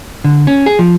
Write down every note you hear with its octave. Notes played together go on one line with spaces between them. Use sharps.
D3
C#4
G#4
F3